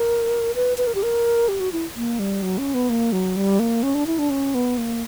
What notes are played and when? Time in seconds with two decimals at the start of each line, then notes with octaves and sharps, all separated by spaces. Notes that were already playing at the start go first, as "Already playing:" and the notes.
Already playing: A#4
0.55 B4
0.78 B4
0.87 A#4
0.95 G4
1.03 A#4
1.48 G4
1.60 F#4
1.72 E4
1.96 A#3
2.19 G3
2.42 F#3
2.58 C#4
2.74 B3
2.90 A#3
3.12 F#3
3.36 G3
3.59 A#3
3.83 C#4
3.95 D4
4.07 E4
4.19 D4
4.30 C#4
4.55 B3
4.78 A#3